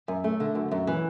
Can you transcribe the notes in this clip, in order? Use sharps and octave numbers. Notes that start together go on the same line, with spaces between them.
F#2
A3
D3
F#2
F#2
E3